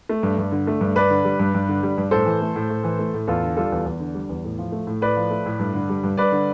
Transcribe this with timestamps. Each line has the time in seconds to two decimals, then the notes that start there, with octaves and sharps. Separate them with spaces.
0.09 A3
0.23 G2
0.38 G2
0.52 D3
0.67 A3
0.81 G2
0.95 G2 B4 D5
1.10 D3
1.25 G3
1.39 G2
1.54 G2
1.69 D3
1.83 G3
1.98 G2
2.11 A2 A4 C5
2.26 E3
2.41 A3
2.56 A2
2.70 A2
2.84 E3
2.99 A3
3.14 A2
3.27 E2 F4 A4
3.43 D3
3.57 G3 F4 A4
3.72 E2
3.86 E2
4.00 D3
4.15 G3
4.29 E2
4.44 A2
4.59 F3
4.72 A3
4.87 A2
5.02 A2 B4 D5
5.17 F3
5.31 A3
5.46 A2
5.59 G2
5.74 D3
5.89 G3
6.03 G2
6.17 G2 B4 D5
6.32 D3